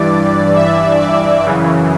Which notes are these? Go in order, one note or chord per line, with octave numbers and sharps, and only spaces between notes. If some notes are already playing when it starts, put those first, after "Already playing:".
Already playing: G2 E3 D5
E5
D5
F#2 C#3 E3